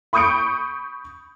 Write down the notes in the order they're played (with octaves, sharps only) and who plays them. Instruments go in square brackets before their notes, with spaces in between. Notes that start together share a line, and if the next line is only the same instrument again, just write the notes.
[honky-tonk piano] B5 C#6 D#6 G6 C#7 D7